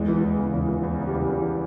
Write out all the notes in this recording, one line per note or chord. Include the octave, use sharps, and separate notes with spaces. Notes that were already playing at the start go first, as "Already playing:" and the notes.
Already playing: E2 G#3
E3
E2
C#3
E2
E3
E2
C#3
G3
E2
E3